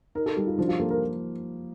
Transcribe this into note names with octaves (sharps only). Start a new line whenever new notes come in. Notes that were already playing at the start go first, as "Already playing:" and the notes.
D#4 A#4
A4
G3 G4
F4
F3 D4
F4
A#3 A4
A#4